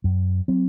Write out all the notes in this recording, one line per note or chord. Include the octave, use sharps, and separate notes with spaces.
F#2
F#3 C4